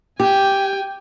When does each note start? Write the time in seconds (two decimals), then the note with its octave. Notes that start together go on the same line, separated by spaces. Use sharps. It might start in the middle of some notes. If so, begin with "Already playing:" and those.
0.20 G4 G5 G#5